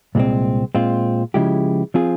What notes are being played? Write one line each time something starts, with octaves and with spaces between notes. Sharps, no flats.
C2 A#2 G#3 C4
A#2 G#3 C4 F4
C#3 F3 G#3 E4 G4
F3 C4 F4 G#4